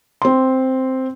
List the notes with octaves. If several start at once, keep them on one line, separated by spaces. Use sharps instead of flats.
C4 C6